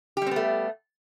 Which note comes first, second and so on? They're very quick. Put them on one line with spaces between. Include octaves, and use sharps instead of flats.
G4 G3 C4 B3 A3